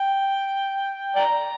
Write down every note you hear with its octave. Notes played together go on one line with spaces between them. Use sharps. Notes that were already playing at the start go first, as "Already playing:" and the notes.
Already playing: G5
D5 G5 A#5